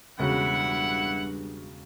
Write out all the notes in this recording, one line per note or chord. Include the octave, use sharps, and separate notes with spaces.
E1 G2 C#3 E4 F#4 F#5